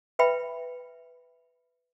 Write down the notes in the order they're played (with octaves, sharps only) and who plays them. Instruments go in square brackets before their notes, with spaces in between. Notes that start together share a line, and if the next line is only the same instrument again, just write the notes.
[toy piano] B4 E5 G5 B5